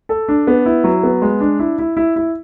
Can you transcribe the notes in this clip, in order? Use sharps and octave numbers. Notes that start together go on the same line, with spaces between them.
A4
D4
B3
E4
F#3
B3
G#3
D4
E4
E4
E4
E4